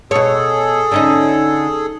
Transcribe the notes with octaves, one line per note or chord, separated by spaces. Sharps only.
B2 G#4 A4 C#5
D3 C#4 D#4